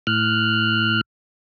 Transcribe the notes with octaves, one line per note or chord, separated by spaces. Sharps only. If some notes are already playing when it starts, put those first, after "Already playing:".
A2 F6 F#6